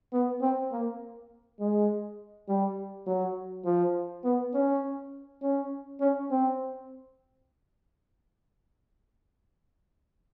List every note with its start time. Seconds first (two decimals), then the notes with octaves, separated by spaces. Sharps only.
0.13 B3
0.41 C4
0.72 A#3
1.60 G#3
2.48 G3
3.07 F#3
3.65 F3
4.24 B3
4.54 C#4
5.42 C#4
6.00 C#4
6.31 C4